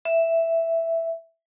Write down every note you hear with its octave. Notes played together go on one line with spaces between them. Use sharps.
E5